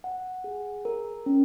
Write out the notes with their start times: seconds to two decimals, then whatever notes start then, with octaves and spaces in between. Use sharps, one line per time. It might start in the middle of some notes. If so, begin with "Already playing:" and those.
0.04 F#5
0.44 G#4
0.85 A#4
1.26 C#4